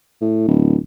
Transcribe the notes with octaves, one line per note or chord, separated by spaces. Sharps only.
A2
D1